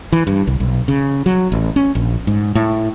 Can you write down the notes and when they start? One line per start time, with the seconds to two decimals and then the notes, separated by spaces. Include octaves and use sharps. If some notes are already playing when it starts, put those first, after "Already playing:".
0.12 E3
0.27 G2
0.47 C2
0.60 B1
0.88 C#3
1.26 F#3
1.52 A1
1.76 C#4
1.95 A#1
2.27 G#2
2.55 A2